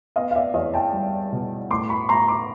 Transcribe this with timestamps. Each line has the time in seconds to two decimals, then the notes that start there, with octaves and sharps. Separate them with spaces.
0.16 B3 D#5 F5
0.31 F5
0.35 D5 E5
0.54 E2 C#5 D#5
0.74 G5 A5
0.93 G3
1.32 B2
1.71 A2 C6 D6
1.89 B5 C#6
2.09 A2 A#5 C6
2.28 C6 D6